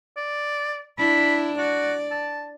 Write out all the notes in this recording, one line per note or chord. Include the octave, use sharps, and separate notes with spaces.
D5
D4 E4 B5
F#4 D5
A5